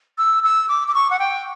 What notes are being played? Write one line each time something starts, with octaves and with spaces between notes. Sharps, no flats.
E6
E6
D6
D6
C#6
F#5
G5